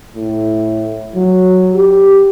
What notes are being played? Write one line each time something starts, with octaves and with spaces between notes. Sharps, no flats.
A2
F#3
G4